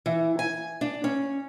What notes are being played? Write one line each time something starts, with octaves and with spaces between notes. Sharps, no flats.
E3
G#5
D4
C#4